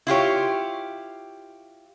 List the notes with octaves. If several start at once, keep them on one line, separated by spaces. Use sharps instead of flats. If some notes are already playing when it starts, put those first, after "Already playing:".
E4 F4 G4 C#5